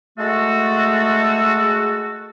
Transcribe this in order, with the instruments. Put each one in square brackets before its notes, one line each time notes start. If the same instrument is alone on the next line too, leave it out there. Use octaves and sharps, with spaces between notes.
[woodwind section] G#3 A3 F#4 A4